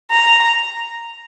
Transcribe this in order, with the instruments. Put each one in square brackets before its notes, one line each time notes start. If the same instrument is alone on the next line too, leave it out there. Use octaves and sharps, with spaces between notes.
[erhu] A#5